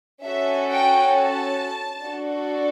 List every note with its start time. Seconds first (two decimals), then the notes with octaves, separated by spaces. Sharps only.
0.25 C#4 F#4 A4 E5
0.70 G5
1.15 A5
2.04 D4 F#4 A4